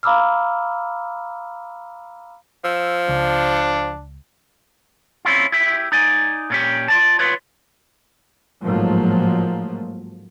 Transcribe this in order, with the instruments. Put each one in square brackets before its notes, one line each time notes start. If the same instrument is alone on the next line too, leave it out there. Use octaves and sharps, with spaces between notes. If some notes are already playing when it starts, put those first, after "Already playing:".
[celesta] F5 A#5 B5 D6 E6 F6
[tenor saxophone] F3 [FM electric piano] E6
[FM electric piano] C#2 [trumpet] D4
[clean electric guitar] C4 C#4 E4 F4
E4 G4 E5
D#4 D5 G#5
A#2 C#4 G4
F4 D5 A5
F4 B4 C#5
[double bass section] A1 G#2 F3 F#3 A3 A#3